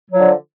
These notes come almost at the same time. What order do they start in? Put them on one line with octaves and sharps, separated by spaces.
F#3 F3 D3